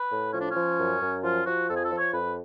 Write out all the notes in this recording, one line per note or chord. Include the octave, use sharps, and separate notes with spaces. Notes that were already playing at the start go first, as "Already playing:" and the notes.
Already playing: B4
A2
F3 C#4
D4
C#4
F3
F#2
F#2
F3 F4
F3 F#4
F2 A4
G#4
A4
F3
C#5
F2 B4